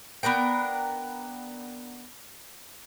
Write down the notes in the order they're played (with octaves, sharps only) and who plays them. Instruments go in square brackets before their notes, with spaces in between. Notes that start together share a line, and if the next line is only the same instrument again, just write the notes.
[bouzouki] B3 D4 A#4 G5